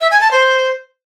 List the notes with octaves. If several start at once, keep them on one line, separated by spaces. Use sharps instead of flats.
E5
G#5
A5
C5